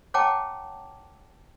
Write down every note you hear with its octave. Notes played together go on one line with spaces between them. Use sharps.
C#5 F#5 G5 A5 A#5 D6